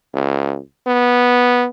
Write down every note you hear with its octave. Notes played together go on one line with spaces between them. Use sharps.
C#2
B3